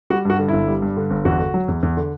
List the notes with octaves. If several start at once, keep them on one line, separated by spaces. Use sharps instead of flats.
G3 F#4
G2 F#4
D3
G1 E4
G3
G2
D3
G1
E2 F#4
D3
F#3
E2
E2
D3